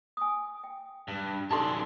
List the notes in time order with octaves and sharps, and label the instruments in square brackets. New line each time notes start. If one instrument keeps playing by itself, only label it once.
[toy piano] G#5 D#6
G5
[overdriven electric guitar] G2
[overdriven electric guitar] F#2 D3 [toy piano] D#4 G4 A4 [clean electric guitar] A5 C6